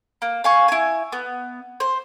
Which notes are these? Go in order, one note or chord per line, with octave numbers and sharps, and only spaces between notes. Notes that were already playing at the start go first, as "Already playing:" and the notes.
A#3
F5 G#5 C#6
E4 G#5
B3
C5